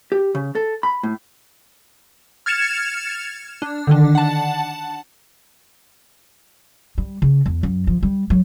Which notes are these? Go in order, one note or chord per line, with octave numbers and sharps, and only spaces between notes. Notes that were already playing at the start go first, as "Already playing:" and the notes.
G4
C#3
A4
B5
A2
F6 G#6 A6 C#7 E7 F7
D4
D3 D#3 D4
F#5 A5
G3
C#3
E2
F#2
F3
G3
F#3